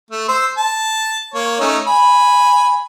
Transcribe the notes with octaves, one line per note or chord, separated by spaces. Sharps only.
A3
C5 E6
A5
A#3 C#5
A3 C#4 D#4
G#5 B5